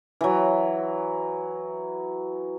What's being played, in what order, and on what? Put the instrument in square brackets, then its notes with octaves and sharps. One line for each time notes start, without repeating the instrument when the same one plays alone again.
[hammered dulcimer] E3 F#3